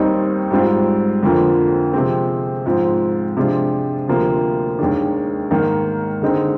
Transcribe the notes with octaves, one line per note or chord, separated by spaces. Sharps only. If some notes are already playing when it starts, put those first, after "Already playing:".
Already playing: D#2 D#3 G3 C4 D#4
G#2 G3 C4 F4
F2 D3 F3 A#3 F4
C3 F3 G#3 C4
G#2 F3 C4
C3 F3 G#3 D4 F4
D2 C3 F3 A#3
D#2 D#3 G#3 D4
G#2 D#3 A#3
D3 G#3 C4 D#4